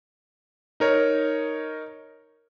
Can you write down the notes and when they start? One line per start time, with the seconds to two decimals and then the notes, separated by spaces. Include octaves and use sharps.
0.80 D#4 A#4 C#5